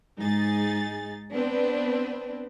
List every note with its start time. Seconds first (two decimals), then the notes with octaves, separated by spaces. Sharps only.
0.19 G#2 D#4 G#4 A6
1.32 B3 C4 D4 B4